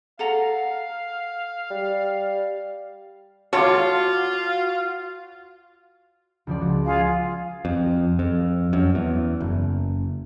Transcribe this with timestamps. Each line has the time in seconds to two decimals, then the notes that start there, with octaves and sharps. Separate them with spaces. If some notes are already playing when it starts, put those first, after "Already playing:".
0.19 A4 F5 F#5 A#5
1.71 G3
3.53 F4 F#4 C#5 F5 A5 C6 D6
6.47 C#2 F3 D5
6.61 F#4
6.85 F4 G#4 F5
7.65 F2
8.19 F2
8.73 F#2
8.95 E2
9.40 F#1